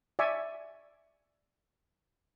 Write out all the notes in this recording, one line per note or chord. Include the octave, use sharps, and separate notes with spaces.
D5 E5 G#5 C#6